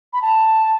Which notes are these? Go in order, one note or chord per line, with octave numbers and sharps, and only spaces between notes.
B5
A5